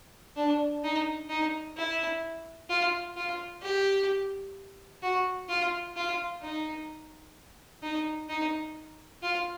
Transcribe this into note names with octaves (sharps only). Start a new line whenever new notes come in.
D4
D#4
D#4
E4
F4
F4
G4
F#4
F4
F4
D#4
D#4
D#4
F4